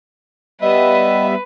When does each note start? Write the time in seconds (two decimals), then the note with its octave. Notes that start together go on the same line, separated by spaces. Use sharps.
0.61 G3 B3 B4 D#5 E5